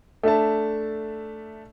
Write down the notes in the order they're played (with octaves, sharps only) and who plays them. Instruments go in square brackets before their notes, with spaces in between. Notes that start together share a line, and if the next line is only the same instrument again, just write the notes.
[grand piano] A3 D4 E5 A5